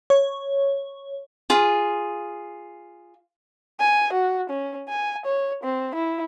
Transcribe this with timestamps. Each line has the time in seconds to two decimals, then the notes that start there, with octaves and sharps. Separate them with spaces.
0.10 C#5
1.50 F4 G#4
3.80 G#5
4.13 F#4
4.50 C#4
4.89 G#5
5.26 C#5
5.63 C4
5.95 E4